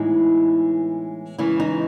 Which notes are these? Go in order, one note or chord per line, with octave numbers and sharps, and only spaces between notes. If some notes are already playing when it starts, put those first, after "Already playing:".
Already playing: A2 E3 G#3 B3 D#4
C#3 E3 G#3 E4
D#4